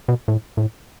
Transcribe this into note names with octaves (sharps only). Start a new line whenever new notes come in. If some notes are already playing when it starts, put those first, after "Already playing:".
B2
A2
A2